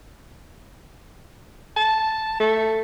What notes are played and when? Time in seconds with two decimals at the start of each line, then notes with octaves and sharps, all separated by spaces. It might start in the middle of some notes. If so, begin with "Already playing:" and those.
1.76 A5
2.40 A3